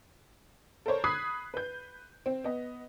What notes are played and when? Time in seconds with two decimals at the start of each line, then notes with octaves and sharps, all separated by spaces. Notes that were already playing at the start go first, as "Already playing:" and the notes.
0.86 A4 A#4 C5 C#5
1.04 B5 D#6 F#6 G#6 B6 C7
1.54 B4 G6
2.26 C4
2.44 B3 D#5